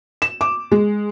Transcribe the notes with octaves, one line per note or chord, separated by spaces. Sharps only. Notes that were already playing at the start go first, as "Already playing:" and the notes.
E7
D6
G#3